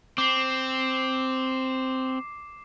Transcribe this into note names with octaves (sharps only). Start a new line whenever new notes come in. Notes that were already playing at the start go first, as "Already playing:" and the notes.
C4 D6 C7